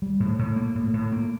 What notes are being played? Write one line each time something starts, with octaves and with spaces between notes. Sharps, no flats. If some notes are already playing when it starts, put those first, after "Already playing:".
G3
A2
A2
A#3
A2
A2
A#3